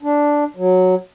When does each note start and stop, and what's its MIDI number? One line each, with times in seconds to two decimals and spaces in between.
0.03 0.44 62
0.57 0.95 54